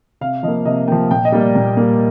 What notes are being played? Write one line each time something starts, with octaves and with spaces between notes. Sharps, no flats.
C3 F5
F3 A#3 D#5
C3 D#5
F3 A#3 G5
A#2 G5
D#5
G3 A#3
D5
A#2
G3 A#3